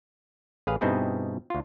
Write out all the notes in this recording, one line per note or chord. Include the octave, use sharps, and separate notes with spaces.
A1 G#4 B4 F5
G2 B2 C4 D#4 E4 G#4
D2 F4